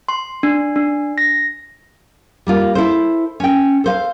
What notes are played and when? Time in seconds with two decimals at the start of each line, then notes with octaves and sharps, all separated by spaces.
0.08 C6
0.43 D4
0.76 D4
1.18 A#6
2.47 G3 A#3 F4
2.75 E4 A4 C5
3.40 C#4 G5
3.84 A4 C5 F5